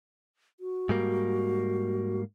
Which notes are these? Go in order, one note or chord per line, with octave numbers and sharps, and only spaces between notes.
F#4
G#2 G3 A#3